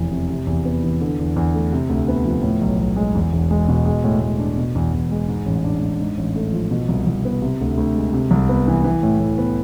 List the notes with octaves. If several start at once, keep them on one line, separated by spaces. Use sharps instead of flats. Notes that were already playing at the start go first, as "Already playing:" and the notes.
Already playing: F1 E2 E3
C3
C3
E2
B3
E3
D3
E2
E2
A3
C3
D2
B3
F3
A2
B1
B1
G#3
E2
E1
G#3
B2
G#3
A2
A2
D4
B2
E2
E2
G#3
G#2
A1
D4
G#3
G#2
A1
A3
F3
B2
C2
C2
B3
C3
D2
D2
G#3
C3
C2
B3
E3
E3
A2
A2
B3